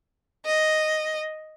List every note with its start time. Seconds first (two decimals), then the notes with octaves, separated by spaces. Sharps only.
0.46 D#5